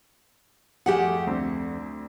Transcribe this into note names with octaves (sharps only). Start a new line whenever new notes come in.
F2 A3 G4 G#4 F#5
D2 C4